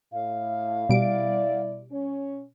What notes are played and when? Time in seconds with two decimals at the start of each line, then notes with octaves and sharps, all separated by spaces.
0.13 A2 F5
0.89 B2 G3 E4 D5 D7
1.91 C#4